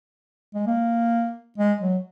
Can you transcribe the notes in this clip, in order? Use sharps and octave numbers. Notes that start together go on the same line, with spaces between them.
G#3
A#3
G#3
F#3